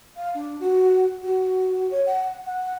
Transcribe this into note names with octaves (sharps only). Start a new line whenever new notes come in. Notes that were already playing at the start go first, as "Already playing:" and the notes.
F5
D4
F#4
F#4
C#5
F#5
F#5